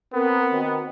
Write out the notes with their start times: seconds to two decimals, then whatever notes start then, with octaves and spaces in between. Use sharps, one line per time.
0.13 B3 C4 A#4
0.52 D#3 C4 F#4